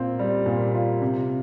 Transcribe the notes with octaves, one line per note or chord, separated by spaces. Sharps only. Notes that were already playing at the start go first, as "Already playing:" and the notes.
Already playing: A#2 C4 F4
G3
A#2
F4
C3